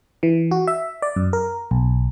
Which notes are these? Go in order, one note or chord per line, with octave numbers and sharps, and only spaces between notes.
E3
F#4
E5
D5
F#2
A#4
B1